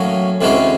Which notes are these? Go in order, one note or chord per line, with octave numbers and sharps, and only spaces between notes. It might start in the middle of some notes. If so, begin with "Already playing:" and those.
Already playing: A2 F#3 A#3 C#4
D2 C3 E3 G#3 C#4